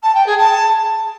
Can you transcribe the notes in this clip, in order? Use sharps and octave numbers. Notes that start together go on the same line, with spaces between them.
A5
G5
G#4
A5